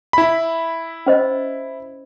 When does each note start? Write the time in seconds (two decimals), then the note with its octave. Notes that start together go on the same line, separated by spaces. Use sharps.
0.13 E4 B5
1.06 C#4 C5 D#5